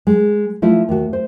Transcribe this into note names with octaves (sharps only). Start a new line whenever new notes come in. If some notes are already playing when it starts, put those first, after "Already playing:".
G#3
F3 A3 E4 F4
D#2 F#4
C5